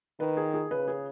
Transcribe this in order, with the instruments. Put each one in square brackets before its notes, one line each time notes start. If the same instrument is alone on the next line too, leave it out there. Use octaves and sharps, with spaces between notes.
[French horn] D#3 [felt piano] B4
[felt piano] G#4
G#4
[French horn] C#3 [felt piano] B4
[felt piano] G#4